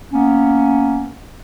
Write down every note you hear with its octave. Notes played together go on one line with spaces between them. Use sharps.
A#3 B3 C#4